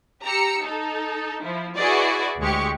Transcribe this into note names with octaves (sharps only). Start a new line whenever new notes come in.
G4 A#5 E6 C#7
D#4 A4
F3 E4
E4 F#4 G#4 B4 D5 D#5
D2 G#3 G4 C#6